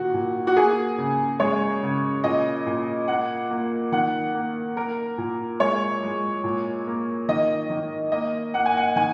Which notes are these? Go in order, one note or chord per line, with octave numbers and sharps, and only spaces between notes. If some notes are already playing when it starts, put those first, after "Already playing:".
Already playing: A#2 D#3 F#4
A#2
F#4
A#3 G#4
C#3
G#3 C#5
C#3
A#2 D#5
A#2
A#3 F#5
A#3
D#3 F#5
A#3
A#3 A#4
A#2
G#3 C#5
G#3
A#2
A#3
D#3 D#5
D#3
A#3 D#5
A#3 F#5
G#5
F#5
D#3 G#5